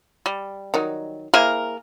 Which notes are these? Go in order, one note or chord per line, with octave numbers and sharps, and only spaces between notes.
G3
D#3 F#3 D#4
A#3 E4 G#4 A#4 C5 E5